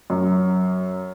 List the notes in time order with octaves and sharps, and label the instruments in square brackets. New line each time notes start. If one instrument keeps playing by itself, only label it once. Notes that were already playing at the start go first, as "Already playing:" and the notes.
[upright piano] F#2